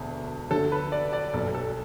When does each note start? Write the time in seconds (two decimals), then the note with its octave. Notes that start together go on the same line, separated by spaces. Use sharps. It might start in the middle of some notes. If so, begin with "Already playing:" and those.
Already playing: E1 D2 D3
0.50 D2 D3 A4
0.72 B4
0.92 D5
1.13 D5
1.34 B1 B2 A4
1.55 A4